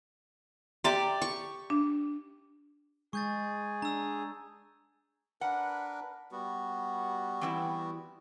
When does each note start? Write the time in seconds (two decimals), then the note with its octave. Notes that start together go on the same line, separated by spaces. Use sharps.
0.84 G4 D5 E5 A#5 C6
1.22 C#6
1.70 D4
3.13 G#3 G#4 C#6 G6 A6
3.82 D4 A#5 E6
5.41 D4 A#4 B4 F#5
6.32 G3 B3 F#4
7.41 E3 C4 E4